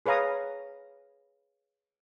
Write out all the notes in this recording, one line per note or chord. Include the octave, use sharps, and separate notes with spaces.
G#4 B4 C#5 F5 A#5 D#6